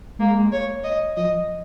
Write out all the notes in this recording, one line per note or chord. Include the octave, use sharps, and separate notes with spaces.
G#3 A#3
C#5
D#5
F3 D#5